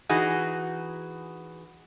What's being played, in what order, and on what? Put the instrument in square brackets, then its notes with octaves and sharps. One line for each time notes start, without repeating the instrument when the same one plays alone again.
[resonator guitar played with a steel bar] E3 D#4 F#4 G#4